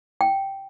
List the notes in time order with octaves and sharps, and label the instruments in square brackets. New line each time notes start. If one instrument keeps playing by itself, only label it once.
[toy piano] G5